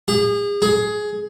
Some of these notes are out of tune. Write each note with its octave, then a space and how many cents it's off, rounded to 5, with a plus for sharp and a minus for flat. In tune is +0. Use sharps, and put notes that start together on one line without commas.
G#4 -35
G#4 +15